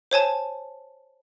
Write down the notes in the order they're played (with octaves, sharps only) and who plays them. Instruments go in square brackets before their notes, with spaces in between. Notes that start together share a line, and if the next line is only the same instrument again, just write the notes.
[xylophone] C5 C#5 G#5 A5